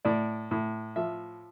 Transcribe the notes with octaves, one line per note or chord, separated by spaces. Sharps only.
A2 D5
A2
F3 E5